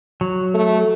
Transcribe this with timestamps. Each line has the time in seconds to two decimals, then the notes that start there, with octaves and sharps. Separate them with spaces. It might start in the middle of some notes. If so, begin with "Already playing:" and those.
0.21 F#3
0.54 A3